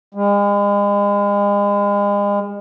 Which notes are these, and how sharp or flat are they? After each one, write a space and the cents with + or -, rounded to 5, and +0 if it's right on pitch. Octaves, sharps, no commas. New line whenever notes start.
G#3 -40